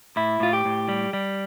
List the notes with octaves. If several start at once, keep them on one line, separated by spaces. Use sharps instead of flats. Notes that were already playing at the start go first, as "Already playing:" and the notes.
A2 E4
A2 F4
G4
A2
G3
G3